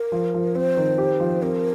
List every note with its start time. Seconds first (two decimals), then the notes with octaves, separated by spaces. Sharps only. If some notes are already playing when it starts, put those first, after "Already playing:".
Already playing: A#4
0.12 F3
0.34 F3
0.55 C4 C5
0.77 D#3
0.98 G4
1.20 F3
1.42 C4 A#4